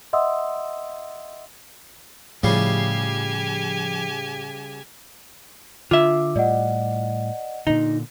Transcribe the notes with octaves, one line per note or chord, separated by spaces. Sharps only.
D#5 E5 F#5 C6 D#6 E6
A2 C#3 F3 G3 G4 G#5 C7
D3 F4 E5 D6
A2 G3 D5 D#5 F#5
A#2 D3 D#4